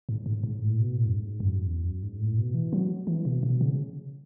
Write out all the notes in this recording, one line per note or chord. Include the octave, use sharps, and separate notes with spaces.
G#2
G#2
G#2
A2
B2
A2
F#2
G#2
F#2
E2
F#2
G#2
A2
B2
E3
F#3
E3
B2
B2
C#3